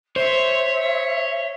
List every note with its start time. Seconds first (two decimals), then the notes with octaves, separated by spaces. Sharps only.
0.16 C5 C#5 E5